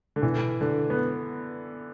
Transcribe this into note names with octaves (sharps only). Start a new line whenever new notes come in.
D3
B2 E3
D3 D4
B3